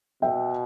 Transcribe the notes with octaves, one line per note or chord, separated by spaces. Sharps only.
B2 E5 G5